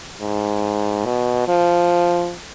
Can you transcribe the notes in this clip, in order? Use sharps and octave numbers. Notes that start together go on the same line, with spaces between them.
G#2
B2
F3